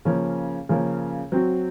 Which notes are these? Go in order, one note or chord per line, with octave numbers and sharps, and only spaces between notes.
C#3 F3 A#3 C#4
C#3 F3 A#3 C#4
F#3 C4 F#4